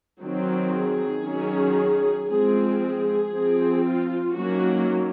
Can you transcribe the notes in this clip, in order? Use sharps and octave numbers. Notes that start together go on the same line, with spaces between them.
D#3 F#3 C4
G#4
D#3 F#3 C#4
F3 G#3 C4 G#4
G#4
F3 C4
F4
D#3 F#3 A#3 C#4 F#4